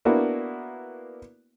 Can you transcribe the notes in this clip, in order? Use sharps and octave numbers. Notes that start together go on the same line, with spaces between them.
A#3 B3 D4 E4 F#4